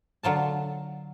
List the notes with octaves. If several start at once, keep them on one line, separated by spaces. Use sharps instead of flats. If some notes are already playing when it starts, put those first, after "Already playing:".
D3 F#3 F4 A5